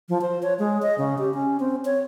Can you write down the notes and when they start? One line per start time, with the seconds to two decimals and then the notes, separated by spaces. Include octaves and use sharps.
0.09 F3
0.22 C5
0.43 C#5
0.59 G#3
0.82 D#5
0.98 C#3
1.18 G4
1.34 C#4
1.60 C4
1.85 C#5